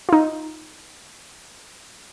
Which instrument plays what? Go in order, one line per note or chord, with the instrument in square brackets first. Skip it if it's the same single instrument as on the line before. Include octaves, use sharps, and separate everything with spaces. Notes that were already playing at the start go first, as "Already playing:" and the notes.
[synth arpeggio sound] D#4 F4